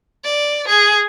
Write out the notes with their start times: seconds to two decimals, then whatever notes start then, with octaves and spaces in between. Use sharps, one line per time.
0.24 D5
0.68 G#4